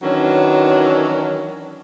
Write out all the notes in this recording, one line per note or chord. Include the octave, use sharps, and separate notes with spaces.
D#3 E3 F#3 C#4 D4